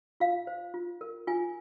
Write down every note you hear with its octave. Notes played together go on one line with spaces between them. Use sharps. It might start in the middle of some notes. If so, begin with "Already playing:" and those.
F4 F5
C5
F4
A#4
F4 G#5